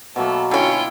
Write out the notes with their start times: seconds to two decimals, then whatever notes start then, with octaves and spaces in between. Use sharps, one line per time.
0.16 B2 F#3 A3 A#3 F#4
0.51 D3 C#4 E4 F4 G5